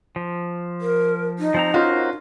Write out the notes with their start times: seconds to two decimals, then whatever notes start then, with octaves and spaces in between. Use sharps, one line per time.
0.16 F3
0.81 A#4
1.39 D#4
1.54 F3 C4 A#5
1.74 C#4 F4 F#4 A#4 C5